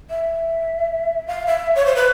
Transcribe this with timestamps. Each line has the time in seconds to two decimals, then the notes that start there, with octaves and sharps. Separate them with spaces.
0.10 E5
1.27 F5
1.47 E5
1.75 C#5
1.85 C5
1.96 B4